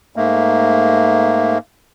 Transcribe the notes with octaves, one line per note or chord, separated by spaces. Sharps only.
G#2 A3 A#3